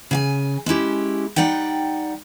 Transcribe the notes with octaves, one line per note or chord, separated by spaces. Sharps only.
C#3 F5 G#5
G#3 C#4 E4 G4
G3 D#4 D5 F#5 G5